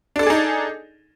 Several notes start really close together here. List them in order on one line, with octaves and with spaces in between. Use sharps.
D4 A4 D5 G#4 D#4